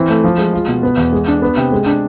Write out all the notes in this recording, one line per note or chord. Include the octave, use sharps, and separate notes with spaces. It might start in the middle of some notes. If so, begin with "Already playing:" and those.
Already playing: E3 C4
A3
F3
G#3
F4
B2
B3
E2
G#3
D4
B3
C3
G#3
D4